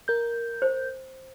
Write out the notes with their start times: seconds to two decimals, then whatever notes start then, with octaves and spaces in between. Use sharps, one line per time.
0.08 A#4 G6
0.62 C5